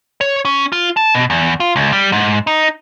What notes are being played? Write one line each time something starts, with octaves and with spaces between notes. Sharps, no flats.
C#5
C#4
F4
A5
B2
E2
F4
C#2
G3
G#2
D#4